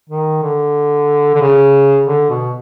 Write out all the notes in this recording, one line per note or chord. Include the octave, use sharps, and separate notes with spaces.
D#3
D3
D3
C#3
D3
B2